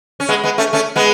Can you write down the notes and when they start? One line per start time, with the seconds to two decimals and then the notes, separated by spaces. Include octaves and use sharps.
0.20 C#4
0.29 G#3 B3
0.44 G#3 B3
0.58 A3 C#4
0.73 A3 C#4
0.96 G#3 B3